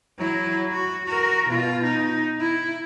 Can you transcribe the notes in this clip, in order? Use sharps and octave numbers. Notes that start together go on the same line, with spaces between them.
F#3 E4
F#4
F#4 A#4
B2 F4
D#4
E4